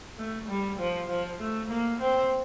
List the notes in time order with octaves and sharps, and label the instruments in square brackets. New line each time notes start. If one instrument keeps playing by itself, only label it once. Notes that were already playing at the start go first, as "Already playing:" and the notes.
[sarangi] A3
G3
F3
F3
A3
A#3
C4